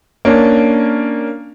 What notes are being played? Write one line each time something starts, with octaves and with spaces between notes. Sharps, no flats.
A#3 C#4 D4